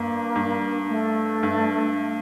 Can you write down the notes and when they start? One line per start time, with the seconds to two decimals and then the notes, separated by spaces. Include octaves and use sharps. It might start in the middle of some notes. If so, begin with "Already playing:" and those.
Already playing: G2 A#3
0.35 G2
0.89 A3
1.43 G2
1.97 A3